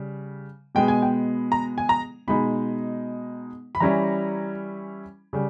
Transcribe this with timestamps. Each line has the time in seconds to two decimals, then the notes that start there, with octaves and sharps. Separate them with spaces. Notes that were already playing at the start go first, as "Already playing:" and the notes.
Already playing: C#3 G3
0.75 B2 G#3 B3 G5
0.88 G#5
1.02 G5
1.52 A#5
1.78 G#5
1.89 A#5
2.28 B2 G#3 D#4 B5
3.75 B5
3.80 E3 G3 C#4 E4 A#5
5.33 C#3 G3